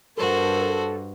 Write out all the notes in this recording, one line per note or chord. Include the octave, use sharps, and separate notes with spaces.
G2 F#4 A4 A#4 C5